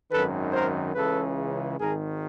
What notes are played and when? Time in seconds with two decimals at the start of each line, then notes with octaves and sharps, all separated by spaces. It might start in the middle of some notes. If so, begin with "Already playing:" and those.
0.10 G#1 F#2 D#3 A4 B4
0.53 A#4 C5
0.95 C#2 C#3 E3 A4 B4
1.79 G#1 G#2 D#3 G#4 A#4